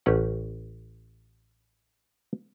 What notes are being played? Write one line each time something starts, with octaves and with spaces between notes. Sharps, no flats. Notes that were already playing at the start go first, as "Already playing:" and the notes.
A1 C#4 G4 B4 F#5